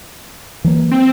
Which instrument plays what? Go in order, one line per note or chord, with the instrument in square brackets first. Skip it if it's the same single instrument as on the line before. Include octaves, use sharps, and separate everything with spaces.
[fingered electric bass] E3 F#3 A#3
[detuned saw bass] C4